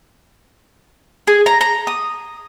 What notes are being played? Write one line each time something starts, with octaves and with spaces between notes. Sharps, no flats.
G#4
A#5
A#5
D#6